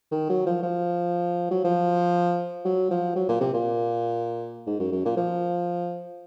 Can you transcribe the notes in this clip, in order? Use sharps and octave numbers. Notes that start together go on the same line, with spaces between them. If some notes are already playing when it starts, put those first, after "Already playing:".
D#3
F#3
F3
F3
F#3
F3
F#3
F3
F#3
A#2
C3
A#2
G#2
F#2
F#2
A#2
F3